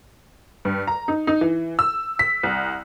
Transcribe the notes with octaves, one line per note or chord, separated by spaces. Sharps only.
G2
A#5
D#4
D#4
E3
E6
B6
C2